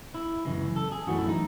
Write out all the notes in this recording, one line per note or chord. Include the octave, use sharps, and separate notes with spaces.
E4
F#2 C#3 E3 G#3
A4
G#4
F#2 E3 A3 F#4
E4
D#4